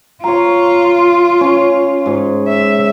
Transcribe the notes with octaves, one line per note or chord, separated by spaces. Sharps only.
F4 C#5 A#5
C#4
G#2 G#4
E5